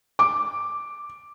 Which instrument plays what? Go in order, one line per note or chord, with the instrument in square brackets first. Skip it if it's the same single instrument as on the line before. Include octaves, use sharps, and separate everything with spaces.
[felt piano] D6